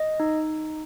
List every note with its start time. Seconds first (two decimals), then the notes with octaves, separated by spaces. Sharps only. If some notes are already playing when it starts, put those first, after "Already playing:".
Already playing: D#5
0.20 D#4